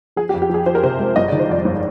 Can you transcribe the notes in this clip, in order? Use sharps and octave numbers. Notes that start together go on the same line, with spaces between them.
F3 G#4
G4
F2
G4
F3 G#4
F3 C5
A#4
C3 C5
G#3
G1 D#5
D#3 D5
C5
F2 D5
G1